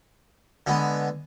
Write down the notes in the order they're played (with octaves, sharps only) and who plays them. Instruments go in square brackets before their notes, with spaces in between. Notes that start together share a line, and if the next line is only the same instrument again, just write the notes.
[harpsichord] D3 G#3 B3